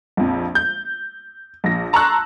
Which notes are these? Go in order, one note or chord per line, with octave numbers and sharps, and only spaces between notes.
A#1 F2
G6
A#1 A#6
A5 A#5 C6 C#6 E6 F#6